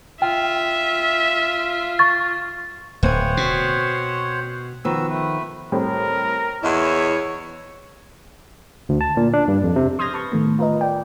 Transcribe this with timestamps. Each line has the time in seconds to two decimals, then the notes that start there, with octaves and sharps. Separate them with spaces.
0.22 F4 E5 G5
1.99 C#6 A6
3.03 D1 B3 C4 C5 C#5 F#5 G#5
3.37 B2
4.85 D#3 F3 B3 F#4 B4 E6
5.10 A3 B4
5.72 A2 G3 C4 A#4
6.63 E2 E4 C#5 D#5 F#5
8.89 D2
9.01 A5
9.17 A#2
9.33 D4
9.48 G2
9.64 F2
9.76 C3
9.99 C6 D#6 F6 G6 G#6 A#6
10.14 B4 A5 C#6
10.32 A2 D#3 A3 B3
10.59 F4 A#4 B4 D#5
10.81 D5 G5